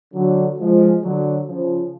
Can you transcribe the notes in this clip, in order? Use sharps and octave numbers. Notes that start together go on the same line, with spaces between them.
D3 F#3
F3 G#3
D3 F#3
C#3 F3